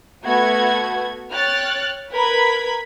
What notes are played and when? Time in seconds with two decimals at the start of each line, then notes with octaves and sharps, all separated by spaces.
0.24 A3 B3 F#4 G#6
1.31 C#5 G5 F6 F#6 A6
2.11 A#4 B4 B5 G#6 B6